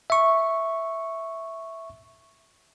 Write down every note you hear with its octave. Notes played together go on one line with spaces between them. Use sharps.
E5 C#6